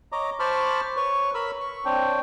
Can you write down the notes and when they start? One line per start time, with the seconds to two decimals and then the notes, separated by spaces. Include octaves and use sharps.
0.12 C#5 D#5 A#5 D6
0.40 C5 A5 B5 C#6 D6 F6
0.97 B4 C#5 C#6
1.34 A#4 C#5 B5 E6
1.60 C#6
1.85 C4 D4 C#5 G5